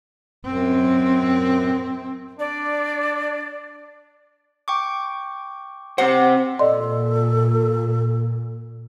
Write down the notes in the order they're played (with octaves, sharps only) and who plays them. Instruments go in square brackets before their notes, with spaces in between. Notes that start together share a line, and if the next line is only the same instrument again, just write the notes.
[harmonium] F#2 [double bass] C4
[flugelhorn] D4 [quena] D5
[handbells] G5 C#6 D6
[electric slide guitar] C4 G4 C5 [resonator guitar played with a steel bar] F#5
[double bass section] A#2 [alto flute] A4 [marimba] D5 D#5 C6